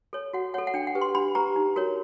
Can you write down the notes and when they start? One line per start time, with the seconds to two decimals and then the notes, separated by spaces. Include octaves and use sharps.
0.13 A4 C#5
0.33 F#4 F#5
0.54 A4 C#5 F#5
0.67 F#5
0.74 D4 G5
0.87 F#5
0.95 G4 B4
1.01 C6
1.15 D4 B5
1.35 G4 B4 A#5
1.56 D#4
1.76 F#4 A#4 C#5